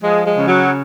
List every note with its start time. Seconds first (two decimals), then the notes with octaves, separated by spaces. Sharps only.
0.02 F3 G#3
0.25 G#3
0.37 C#3
0.47 F#3